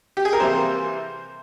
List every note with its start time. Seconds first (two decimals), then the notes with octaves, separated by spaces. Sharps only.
0.17 G4
0.25 G#4
0.33 A#4
0.40 C3 E3 G3 A#3 C5